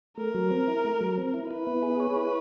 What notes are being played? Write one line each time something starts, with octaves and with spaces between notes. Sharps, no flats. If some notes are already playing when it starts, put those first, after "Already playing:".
A3 A#4
F#3
C4
E4
A3
F#3
C4
E4
E4 B4
B3
G#4
C#5
E4